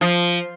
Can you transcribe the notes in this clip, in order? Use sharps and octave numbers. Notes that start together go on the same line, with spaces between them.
F3